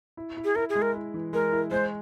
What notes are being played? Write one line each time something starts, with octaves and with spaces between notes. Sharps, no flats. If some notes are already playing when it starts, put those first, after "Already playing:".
E4
E4
G#4
E4 A#4
G#4
G#3
A#4
E4
E3
G#3 A#4
E4
G#3 C5